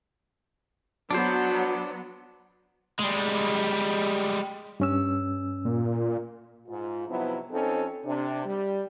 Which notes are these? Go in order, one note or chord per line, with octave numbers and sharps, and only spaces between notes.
F#3 B3 D4 C5
G3 G#3
G2 C#4 E6
A#2
G#2 F4
C3 F3 F#3 B3 D#4 E4
F2 C4 C#4 D#4 A4
C3 D4
G3